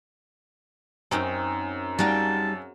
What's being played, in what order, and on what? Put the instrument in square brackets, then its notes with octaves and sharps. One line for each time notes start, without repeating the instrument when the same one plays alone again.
[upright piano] F#2 [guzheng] C4 C#4 D#4
[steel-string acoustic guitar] G3 D#4 G5 [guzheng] F#4 G#4 F5 [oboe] A5